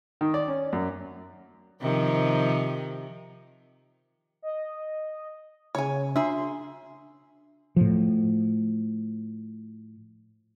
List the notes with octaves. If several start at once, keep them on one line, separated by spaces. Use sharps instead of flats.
D#3
D5
C#4
F#2
C3 D#3 F3
D#5
C#3 C#5 G#5
D4 G#4 E5 C6
A2 F3